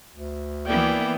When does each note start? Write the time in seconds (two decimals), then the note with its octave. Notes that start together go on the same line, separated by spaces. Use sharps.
0.14 D2
0.67 E3 A#3 B3 E4 D5 G5